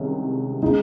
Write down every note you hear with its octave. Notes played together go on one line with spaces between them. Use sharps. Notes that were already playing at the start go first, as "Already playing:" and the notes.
Already playing: C2 C3 D#3 G#3 C#4
C#3 G#3 D#4